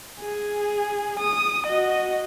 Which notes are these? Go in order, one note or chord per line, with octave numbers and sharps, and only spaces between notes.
G#4
D#6
F#4 D#5